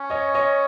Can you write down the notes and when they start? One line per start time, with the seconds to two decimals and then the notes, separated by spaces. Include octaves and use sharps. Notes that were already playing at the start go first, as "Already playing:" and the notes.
Already playing: C#4
0.10 C#5 D#5
0.34 C#5 D#5